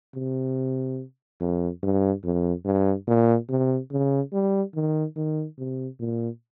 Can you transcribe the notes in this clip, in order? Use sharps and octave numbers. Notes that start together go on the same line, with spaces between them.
C3
F2
G2
F2
G2
A#2
C3
C#3
G3
D#3
D#3
C3
A#2